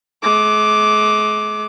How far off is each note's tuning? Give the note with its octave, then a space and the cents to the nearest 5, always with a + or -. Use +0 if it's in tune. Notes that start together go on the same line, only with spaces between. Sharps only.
G#3 +40 D6 +0